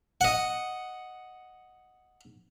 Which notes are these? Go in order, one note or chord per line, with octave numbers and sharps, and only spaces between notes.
D#5 F#5